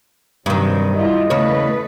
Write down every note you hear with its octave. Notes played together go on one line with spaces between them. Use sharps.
G2 C3 D#3 F#3
G3 E4 F4 D#5
E2 C#3 A3 A#3 B4 C#5